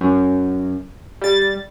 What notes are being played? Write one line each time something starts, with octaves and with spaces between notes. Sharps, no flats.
F#2
G3 A6